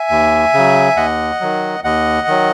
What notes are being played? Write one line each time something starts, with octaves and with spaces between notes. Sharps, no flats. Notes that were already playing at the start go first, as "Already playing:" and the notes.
Already playing: E5 G#5
D#2
C#3 F#3
D#2 D#5 F#5
D#3 F#3
D#2 D#5 F#5
D#3 F#3